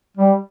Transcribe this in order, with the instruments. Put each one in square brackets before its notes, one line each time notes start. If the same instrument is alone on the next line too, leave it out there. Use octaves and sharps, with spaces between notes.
[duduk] G3